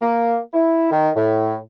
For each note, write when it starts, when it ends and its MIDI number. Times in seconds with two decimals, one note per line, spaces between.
0.01 0.38 58
0.54 0.90 64
0.91 1.09 51
1.16 1.55 45